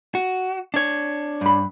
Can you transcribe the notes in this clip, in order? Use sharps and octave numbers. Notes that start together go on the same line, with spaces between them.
F#4
D4 C#5
G2 B5